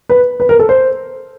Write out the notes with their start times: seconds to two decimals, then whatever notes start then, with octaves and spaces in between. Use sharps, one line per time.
0.09 B4
0.40 B4
0.49 A#4
0.59 A4
0.69 C5